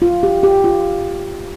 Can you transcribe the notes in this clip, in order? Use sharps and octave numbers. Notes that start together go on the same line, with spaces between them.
F4
G4
G4
F4